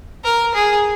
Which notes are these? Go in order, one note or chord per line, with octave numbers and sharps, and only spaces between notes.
A#4
G#4